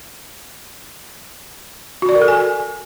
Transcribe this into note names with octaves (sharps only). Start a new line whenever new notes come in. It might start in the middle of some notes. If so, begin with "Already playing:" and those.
F#4
D5
A#4
A4
G#5